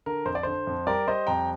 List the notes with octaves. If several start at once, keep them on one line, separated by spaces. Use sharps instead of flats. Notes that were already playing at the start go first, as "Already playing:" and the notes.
D3 A#4
F2 C5
D5
D3 C5
F2
G3 A#4 D5
G3 C5 D#5
F2 G5 A#5